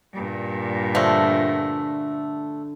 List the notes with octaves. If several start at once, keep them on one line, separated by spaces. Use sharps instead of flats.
G2 A#2
D3 F3 A3